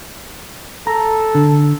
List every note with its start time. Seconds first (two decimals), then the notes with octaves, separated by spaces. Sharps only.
0.87 A4 A#5
1.35 D3